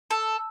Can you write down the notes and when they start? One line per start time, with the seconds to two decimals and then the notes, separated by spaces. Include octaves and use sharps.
0.11 A4